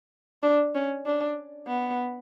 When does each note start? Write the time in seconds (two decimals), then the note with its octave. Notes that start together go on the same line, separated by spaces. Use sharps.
0.43 D4
0.75 C#4
1.06 D4
1.68 B3